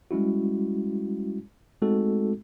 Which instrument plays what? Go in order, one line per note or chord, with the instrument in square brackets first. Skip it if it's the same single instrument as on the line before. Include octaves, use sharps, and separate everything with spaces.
[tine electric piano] G3 G#3 C#4 E4 F#4
G#3 A3 C4 D#4 F#4 A4